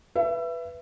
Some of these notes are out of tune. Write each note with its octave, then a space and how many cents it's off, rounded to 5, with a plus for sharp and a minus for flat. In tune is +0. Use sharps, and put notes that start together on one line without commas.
B4 +0 E5 +25